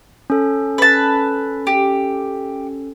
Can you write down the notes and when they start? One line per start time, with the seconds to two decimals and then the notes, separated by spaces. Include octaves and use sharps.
0.30 C#4 A4
0.78 B4 A5
1.67 G4